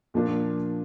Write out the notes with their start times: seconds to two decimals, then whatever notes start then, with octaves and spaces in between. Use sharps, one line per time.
0.14 A#2 F3 A#3 D4 F4